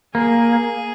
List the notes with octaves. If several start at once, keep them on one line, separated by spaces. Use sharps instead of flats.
A#3 G#4